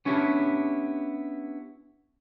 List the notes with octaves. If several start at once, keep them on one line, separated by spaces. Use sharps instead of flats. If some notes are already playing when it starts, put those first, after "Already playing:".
B3 C#4 D4 E4 G4